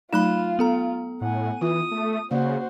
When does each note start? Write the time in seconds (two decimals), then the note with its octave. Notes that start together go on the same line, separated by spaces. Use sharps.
0.13 F#3 A3 D#4 F4 B5 F#6 E7
0.59 B3 A4 A#5
1.21 A2 F#5 G#5
1.61 E3 F4 D#6
1.91 A3
2.31 C#3 A#3 F#4 C5 D5